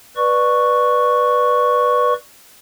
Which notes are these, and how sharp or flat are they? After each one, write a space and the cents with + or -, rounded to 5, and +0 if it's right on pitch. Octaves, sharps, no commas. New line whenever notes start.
B4 -5 D5 +20 C#6 +0